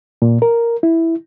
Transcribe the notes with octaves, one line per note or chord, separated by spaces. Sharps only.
A#2
A#4
E4